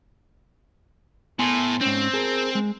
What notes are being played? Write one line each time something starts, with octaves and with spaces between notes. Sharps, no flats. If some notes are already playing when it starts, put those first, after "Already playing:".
A2 B3 G#5 C6
G#2 C4 C#4
G#4 A#4
G#3